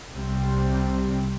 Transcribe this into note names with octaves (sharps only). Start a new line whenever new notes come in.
C2 C3 G3 C4